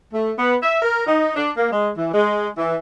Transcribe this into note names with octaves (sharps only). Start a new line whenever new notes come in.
A3
B3
E5
A#4
D#4
D4
A#3
G#3
E3
G#3
E3